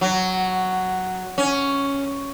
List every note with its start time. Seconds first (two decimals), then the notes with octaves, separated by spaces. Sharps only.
0.01 F#3
1.38 C#4